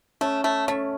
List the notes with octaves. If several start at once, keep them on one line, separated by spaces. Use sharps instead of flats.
A3 C#4
A3
A3 C#4